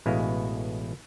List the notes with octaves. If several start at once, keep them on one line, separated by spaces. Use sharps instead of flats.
A1 B2 G#3 E4 F5